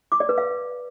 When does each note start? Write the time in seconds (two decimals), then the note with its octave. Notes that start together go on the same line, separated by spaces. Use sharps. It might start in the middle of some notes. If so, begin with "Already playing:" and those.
0.12 D6
0.20 D5
0.29 B4
0.38 F5